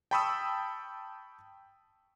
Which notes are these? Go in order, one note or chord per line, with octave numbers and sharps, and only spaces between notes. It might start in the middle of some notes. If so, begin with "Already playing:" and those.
G5 A5 B5 C#6 D#6 E6